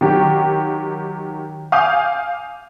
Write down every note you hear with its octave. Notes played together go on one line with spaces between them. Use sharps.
D#3 F#3 G4
F5 G#5 D6 D#6 G6